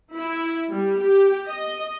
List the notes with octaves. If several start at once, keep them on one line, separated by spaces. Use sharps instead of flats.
E4
G3
G4
D#5